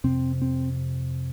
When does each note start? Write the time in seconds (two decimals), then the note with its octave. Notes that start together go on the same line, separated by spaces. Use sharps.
0.04 F2 C3 C4
0.42 C4